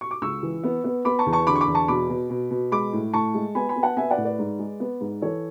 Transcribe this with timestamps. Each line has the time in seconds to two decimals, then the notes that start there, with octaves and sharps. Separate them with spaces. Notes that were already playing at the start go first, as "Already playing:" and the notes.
0.01 C#6
0.11 D6
0.22 C#2 C#6 E6
0.43 E3
0.64 B3
0.84 B3
1.05 B3 B5 D6
1.19 A5 C#6
1.26 E2
1.33 A5 C#6
1.47 D3 B5 D6
1.55 C#6
1.61 B5 D6
1.68 E2
1.75 A5 C#6
1.88 B2 B5 D6
2.09 B2
2.30 B2
2.51 B2
2.72 G#3 B5 D6
2.93 A2
3.13 A2 A5 C#6
3.34 G#3
3.55 B3 G#5 B5
3.69 G#5 B5
3.76 B3
3.83 F#5 A5
3.97 B3 E5 G#5
4.11 D5 F#5
4.17 A2
4.25 B4 D5
4.39 G#2
4.59 G#3
4.80 B3
5.01 G#2
5.21 E3 A4 C#5